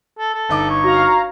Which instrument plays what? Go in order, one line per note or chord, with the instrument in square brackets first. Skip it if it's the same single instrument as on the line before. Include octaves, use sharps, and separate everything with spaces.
[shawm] A4
A4
[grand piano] G1 D#4 D6
[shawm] C#5
[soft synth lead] F#4 [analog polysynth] F5 A#5